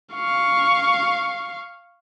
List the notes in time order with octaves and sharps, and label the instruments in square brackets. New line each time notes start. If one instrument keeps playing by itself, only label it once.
[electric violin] F5 C#6